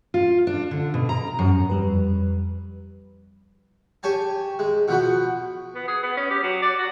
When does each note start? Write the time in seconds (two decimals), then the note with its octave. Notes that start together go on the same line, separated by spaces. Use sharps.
0.14 F4
0.47 D4
0.71 D3
0.94 B2
1.09 A#5
1.39 F#2
1.70 F2 G3 B4
4.03 G4 C#5 G#5 A5
4.59 G#3
4.88 B2 F3 B3 F#4
5.75 B3
5.88 G#4
6.03 B3
6.17 C#4
6.30 G4
6.43 F#3
6.62 D5
6.78 F#4